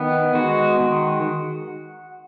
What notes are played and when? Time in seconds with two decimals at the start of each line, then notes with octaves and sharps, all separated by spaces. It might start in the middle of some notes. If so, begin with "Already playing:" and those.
Already playing: D#3 B3
0.35 G#3 F#4
0.79 D#3